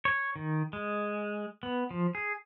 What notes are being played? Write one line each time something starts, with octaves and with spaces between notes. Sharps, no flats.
C#5
D#3
G#3
B3
F3
G#4